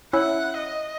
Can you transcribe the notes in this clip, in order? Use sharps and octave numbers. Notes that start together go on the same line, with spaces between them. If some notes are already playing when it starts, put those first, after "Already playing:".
C#4 E4 F#5
D#5